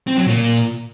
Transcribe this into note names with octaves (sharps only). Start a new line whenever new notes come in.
C4
F#3
A#2